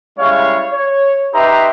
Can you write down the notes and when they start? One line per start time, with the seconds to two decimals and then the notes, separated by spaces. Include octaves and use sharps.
0.18 G3 G#3 C#4 E4 C#5 F5
0.72 C#5
1.33 D#4 G4 B4 E5 A#5 C6